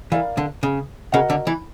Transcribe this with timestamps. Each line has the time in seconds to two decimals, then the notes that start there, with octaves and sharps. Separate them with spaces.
0.12 E3 A#4 D5 F5
0.37 D3
0.63 C#3
1.12 C#3 F#4 A#4 D#5 F#5
1.30 D3
1.47 E3